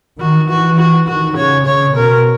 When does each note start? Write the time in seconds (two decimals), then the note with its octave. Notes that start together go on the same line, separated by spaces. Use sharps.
0.20 D#3 F#4
0.49 E3 F#4
0.79 F#4
1.08 D#3 F#4
1.36 C#3 C#5
1.66 C#3 C#5
1.95 B2 A#4